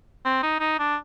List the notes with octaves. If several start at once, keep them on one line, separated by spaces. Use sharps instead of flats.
C4
D#4
D#4
D4